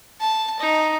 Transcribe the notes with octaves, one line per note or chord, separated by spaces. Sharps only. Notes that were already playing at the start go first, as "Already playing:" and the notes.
A5
D#4